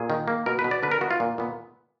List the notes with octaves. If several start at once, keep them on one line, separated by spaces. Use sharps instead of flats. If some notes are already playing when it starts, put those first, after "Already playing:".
Already playing: A#2 G#4
D#3
A#3
B2 A#4
B4
B2
D5
D3 B4
A#4
B3 F#4
F4
A#2
A#2 B3